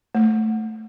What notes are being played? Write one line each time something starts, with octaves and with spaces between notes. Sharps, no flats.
A3